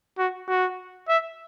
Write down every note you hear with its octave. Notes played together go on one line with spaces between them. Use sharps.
F#4
F#4
E5